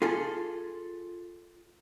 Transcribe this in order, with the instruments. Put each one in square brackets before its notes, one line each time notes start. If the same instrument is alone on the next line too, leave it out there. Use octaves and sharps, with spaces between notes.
[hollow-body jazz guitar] F4 G#4 A4